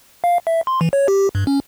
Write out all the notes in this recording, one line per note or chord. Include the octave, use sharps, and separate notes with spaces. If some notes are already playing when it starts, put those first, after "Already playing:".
F5
E5
C6
E3
C#5
G4
G2
C#4